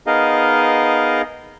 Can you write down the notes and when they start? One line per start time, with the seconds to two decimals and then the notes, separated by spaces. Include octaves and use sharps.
0.07 B3 D#4 G#4 A#4 D#5 F5